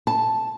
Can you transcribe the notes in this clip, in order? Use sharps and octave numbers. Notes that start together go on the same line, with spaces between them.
A5